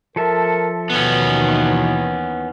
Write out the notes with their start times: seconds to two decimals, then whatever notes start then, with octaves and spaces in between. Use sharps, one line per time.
0.16 F3 A4 A#4 E5
0.90 D#2 B2 D#3 E3 B3 C#4